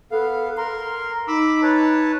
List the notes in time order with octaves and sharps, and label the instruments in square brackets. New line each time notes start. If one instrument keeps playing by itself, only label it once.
[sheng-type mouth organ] B3 F5 [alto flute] A4
[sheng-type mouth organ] A#4 C6 [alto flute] A#5
[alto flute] D#4 [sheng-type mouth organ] B5 D6 E6
[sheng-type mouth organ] B4 C#5 A5